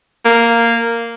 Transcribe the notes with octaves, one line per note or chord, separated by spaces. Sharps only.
A#3